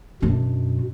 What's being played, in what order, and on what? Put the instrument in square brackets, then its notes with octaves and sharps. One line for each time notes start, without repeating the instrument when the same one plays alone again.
[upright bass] F#2 D4 [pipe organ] B2